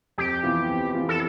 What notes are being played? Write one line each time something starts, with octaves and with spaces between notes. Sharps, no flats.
F2 G4
E3 B3 F4
F2
E3 B3 F4
A4